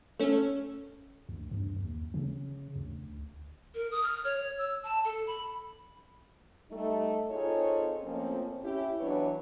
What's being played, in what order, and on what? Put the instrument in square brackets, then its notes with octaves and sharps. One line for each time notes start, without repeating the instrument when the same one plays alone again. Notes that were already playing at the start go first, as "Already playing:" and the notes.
[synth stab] A3 C#4
[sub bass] D2
G2
D#2
C#3
D2
[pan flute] A#4
D#6
F6
C#5
E6
A5
A4
B5
[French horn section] G3 A3 D#4
C4 D#4 F4 G#4 A4 C#5
F2 A2 F3 A#3 C4 C#4
C#4 E4 G4
B2 E3 F#3 D4 B4 C#5